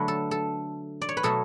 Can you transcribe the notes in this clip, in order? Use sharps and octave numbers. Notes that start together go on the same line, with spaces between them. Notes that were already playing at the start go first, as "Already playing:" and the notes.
Already playing: D3 F#3 A3 B4
A4
A4
D5
C#5
B4
B2 F#3 A3 A4